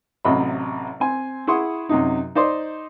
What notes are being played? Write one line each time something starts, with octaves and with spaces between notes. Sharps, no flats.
A1 C3 F#3 D#5 E5 B5
C4 G#5
E4 G#4 F#5 C6 C#6 D#6
F#2 C3 D#4
D#4 C5 D5 C6